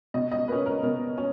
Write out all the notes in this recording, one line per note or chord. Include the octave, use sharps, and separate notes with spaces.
B2 D#5
D#5
A#3 C#4 B4
A#4
B2 A#4
C#4